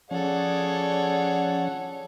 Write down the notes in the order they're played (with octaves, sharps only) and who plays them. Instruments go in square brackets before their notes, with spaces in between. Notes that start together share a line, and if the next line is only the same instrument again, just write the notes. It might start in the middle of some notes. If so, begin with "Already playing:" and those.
[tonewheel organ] F3 C#4 [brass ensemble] G#4 D5 [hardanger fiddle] A4 C#5 [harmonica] F#5